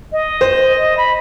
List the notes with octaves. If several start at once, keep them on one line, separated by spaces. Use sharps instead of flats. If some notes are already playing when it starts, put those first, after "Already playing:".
D#5
C5
B5